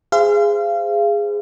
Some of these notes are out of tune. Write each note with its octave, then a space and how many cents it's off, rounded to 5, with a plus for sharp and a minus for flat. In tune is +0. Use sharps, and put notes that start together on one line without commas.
G#4 -10 C5 -30 F5 -30